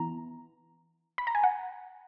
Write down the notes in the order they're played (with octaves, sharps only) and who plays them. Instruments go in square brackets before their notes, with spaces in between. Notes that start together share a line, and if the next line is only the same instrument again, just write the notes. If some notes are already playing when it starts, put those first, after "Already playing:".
Already playing: [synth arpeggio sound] E3 B3 E4 A#5
B5
A#5
G#5
F#5